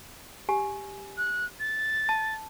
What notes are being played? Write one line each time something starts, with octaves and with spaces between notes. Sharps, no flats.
G4 G#5
F#6
A6
A5